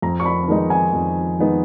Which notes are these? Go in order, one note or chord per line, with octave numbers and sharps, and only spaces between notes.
F2 A#5
C#6
B5
D#3 G#3 B3 D#4
G#5
F2
D#3 G#3 B3 D#4